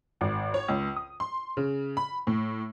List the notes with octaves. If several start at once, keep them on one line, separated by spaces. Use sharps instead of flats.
G#1
C#5
C#2
D#6
C6
C#3
B5
A2